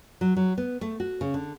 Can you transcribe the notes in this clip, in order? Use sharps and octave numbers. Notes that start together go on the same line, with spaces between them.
F#3
F#3
B3
A3
F#4
C#3
D3